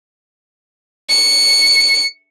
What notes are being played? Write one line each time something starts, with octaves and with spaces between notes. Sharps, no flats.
C#7